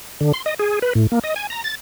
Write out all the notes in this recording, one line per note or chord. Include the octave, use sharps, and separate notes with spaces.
D3
C6
D#5
G#4
B4
A2
A#3
D#5
G#5
A#5
A6